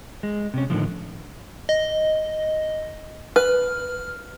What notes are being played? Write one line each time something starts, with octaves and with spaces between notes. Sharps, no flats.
G#3
C3 C#4
A2 D3 D#3 F3
D#5
B4 F6